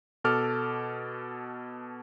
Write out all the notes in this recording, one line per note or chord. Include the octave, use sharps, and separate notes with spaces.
B2 A4 D6 F6